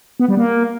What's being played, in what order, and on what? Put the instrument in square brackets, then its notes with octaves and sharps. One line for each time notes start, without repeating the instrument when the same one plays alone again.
[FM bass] B3
G3
A#3